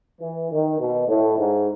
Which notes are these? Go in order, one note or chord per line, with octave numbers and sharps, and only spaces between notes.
E3
D#3
B2
A2
G#2